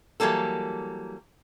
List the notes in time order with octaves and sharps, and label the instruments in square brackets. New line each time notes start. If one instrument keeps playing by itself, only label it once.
[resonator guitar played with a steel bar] E3 F#3 G3 A#3 A4